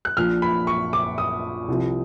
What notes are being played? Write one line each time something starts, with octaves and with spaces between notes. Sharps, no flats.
F#6
A#1 A#2 F3 F6
B5
C#6
D6
D#6
C2 C3 F3